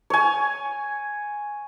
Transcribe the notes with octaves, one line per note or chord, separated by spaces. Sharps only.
C#5 G#5